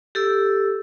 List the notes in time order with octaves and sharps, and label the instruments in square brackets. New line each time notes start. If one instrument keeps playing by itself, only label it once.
[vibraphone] G4 A4 E6